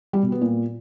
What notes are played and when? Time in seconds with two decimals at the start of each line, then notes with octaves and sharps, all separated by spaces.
0.13 G3
0.23 B2
0.32 B3
0.41 A#2